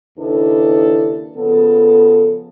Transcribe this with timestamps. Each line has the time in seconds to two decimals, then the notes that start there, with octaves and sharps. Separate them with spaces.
0.18 D#2 C#3 D4 E4 A4 B4
1.36 C#3 F3 B3 A4